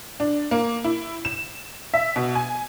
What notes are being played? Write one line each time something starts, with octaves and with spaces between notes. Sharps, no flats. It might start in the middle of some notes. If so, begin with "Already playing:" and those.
D4
A#3
E4
E7
E5
B2
G#5